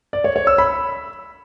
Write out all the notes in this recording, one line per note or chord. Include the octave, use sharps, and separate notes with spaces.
D5
C#5
C#5
E6
B5